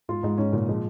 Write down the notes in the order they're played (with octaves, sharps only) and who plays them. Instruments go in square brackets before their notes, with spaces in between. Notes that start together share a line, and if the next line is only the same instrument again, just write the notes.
[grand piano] G#2 [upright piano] F4
[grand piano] G#2 [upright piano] G#3
[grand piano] G#2 [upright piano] C#4
[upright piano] A#2 [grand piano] C#3
[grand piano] F3 [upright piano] G#3